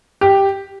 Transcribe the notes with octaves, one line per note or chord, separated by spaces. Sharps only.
G4